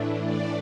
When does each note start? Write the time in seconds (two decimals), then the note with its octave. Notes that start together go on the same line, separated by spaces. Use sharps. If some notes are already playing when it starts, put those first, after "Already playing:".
Already playing: A2 E3 A3 D4
0.19 D5